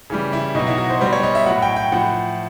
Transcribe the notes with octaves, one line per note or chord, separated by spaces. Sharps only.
C#3 E3 G3
E4
B2 F#3 D#4
E4
F#4
C5
B2 G3 C5
C#5
D#5
E5
A2 F#3 F#5
G5
G5
A2 F3 F#5